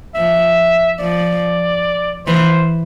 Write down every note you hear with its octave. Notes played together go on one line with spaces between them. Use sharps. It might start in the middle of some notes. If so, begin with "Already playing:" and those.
F3 E5
F3 D5
E3 C5